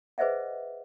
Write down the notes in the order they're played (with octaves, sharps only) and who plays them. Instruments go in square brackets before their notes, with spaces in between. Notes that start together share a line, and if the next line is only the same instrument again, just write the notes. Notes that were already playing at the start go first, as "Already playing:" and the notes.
[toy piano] G#4 B4 C5 D#5 E5 F#5